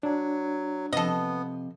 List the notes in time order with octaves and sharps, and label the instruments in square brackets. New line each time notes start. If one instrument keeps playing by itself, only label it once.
[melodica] F#3 [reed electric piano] D4
[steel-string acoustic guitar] C3 F3 [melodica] B3 [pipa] A4 D#5